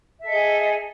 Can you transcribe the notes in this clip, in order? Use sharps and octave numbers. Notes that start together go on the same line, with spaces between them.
G#4 A4 D#5 E5